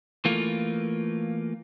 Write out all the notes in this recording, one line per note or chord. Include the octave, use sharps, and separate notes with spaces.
E3 A3 A#3 F4